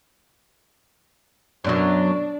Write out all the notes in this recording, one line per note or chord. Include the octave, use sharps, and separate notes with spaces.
F#2 B2 F#3 D4